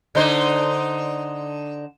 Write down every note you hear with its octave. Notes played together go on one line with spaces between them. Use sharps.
D3 D#4 C5